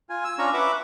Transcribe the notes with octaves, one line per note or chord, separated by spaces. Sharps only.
F4 G#5
E6
C#4 D4 F4 A#5 C#6
B4 E5 F#5 D6